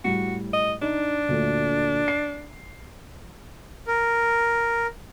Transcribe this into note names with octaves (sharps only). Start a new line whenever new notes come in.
A2 G3 F#4
D#5
D4 D#4
D2 A#2 A3
C7
A#4